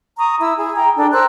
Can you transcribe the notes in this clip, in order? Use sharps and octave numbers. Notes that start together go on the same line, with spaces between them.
A#5 C#6 D#6
E4 E6
G#4
G5 A#5
D4 A4 G5
A#4 C5 E6 F#6